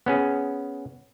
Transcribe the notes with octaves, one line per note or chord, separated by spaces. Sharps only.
B3 C#4 G#4